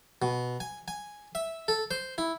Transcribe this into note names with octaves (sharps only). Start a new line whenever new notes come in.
B2
G#5
G#5
E5
A4
C5
E4